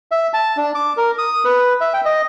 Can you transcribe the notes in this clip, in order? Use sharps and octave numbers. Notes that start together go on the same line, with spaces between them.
E5
A5
D4
D6
A#4
D#6
B4
E5
G5
D#5